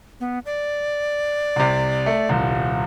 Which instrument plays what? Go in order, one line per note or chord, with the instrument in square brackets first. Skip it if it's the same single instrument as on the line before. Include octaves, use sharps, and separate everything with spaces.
[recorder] B3
D5
[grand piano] C2 C3
A3
D#1 C2